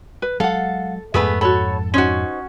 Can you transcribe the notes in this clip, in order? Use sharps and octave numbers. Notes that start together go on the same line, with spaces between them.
B4
F#3 G#3 A4 F5 F#5
F2 G#2 A3 B3 G#4 B4
F#4 A4 C#5 B5
C#4 D#4 F#4 C5